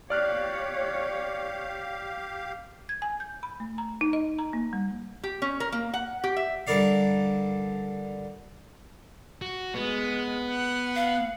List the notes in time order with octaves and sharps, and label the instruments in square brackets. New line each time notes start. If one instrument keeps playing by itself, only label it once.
[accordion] G4 F5 [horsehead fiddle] C#5 [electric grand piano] D5 F6 F#6
[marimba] G#6
G#5
G6
B5
A3
A#5
D#4
D#5
A#5
A#3
G3
[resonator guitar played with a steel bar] G4
C#4
A#4
A#3
F#5
G4
E5
[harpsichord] G2 D3 A#4 D5 F5
[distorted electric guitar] F#4
[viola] G#3 [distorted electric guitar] B3
[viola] F#5
[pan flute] F5